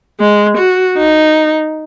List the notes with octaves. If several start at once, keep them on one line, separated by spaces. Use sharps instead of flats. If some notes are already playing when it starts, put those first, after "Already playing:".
G#3
F#4
D#4